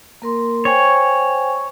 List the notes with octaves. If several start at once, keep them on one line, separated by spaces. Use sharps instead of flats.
A#3 A#4 C6
C5 C#5 G5 G#5